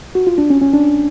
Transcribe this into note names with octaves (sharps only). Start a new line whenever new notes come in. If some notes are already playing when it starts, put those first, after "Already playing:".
F#4
F4
D4
C#4
C#4
D4